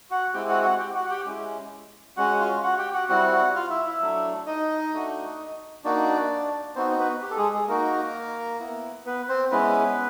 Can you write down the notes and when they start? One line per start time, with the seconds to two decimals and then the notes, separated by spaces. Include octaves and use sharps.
0.10 F#4 F#5
0.33 G#3 C4 E4 G4 G5
0.49 F#4 F#5
0.64 F#4 F#5
0.79 G4 G5
0.94 F#4 F#5
1.05 F#5
1.11 G4 G5
1.26 G#3 C#4 E4
2.17 G#3 C#4 F#4 F#5
2.40 F4 F5
2.63 F#4 F#5
2.78 G4 G5
2.93 F#4 F#5
3.09 G3 C4 E4 F#4 F#5
3.32 F#4 F#5
3.55 F4 F5
3.70 E4 E5
3.85 E4 E5
4.00 F#3 A3 D4
4.46 D#4 D#5
4.93 A3 D4 F#4
5.84 A#3 D4 D#4 F#4 D5
6.76 B3 C4 D#4 F#4 C5
6.99 B3 B4
7.22 G4
7.30 A4
7.37 G#3 G#4
7.53 G#3 G#4
7.68 A#3 D#4 F#4 A#4
8.60 B3 E4
9.05 B3 B4
9.29 C4 C5
9.51 G#3 B3 C#4 E4 B4